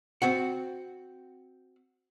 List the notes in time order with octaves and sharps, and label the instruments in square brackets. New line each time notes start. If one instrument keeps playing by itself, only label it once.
[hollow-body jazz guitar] C4 F#4 F#5